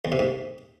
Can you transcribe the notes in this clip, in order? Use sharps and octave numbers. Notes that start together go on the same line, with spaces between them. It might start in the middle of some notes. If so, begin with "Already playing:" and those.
E2
C3
G#2